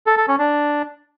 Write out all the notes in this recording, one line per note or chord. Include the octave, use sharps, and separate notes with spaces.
A4
A4
C#4
D4